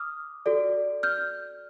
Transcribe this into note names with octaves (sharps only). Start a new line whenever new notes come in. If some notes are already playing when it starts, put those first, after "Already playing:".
Already playing: D6 D#6 F6
F#4 A4 D5
F6 G6